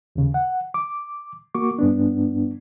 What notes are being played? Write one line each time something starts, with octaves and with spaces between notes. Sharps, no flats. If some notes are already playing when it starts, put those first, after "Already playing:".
D#2 C#3
F#5
D6
A#3 F#4 C#6 D6
G2 B3 D4